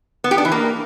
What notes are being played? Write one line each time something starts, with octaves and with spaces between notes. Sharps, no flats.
B3
G4
D4
E3
A#3